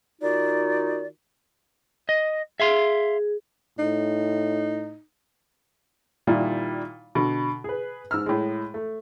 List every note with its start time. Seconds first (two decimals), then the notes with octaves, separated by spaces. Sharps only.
0.22 D#3 D#4 F4 F#4 D5
2.09 D#5
2.60 G#4 E5 F5 C6
3.79 A2 D#4
6.27 A#2 D#3 G3 E4
7.15 B2 D3
7.64 G#4 B4
8.11 G#2 E6 F6
8.26 A2 G#3
8.74 A3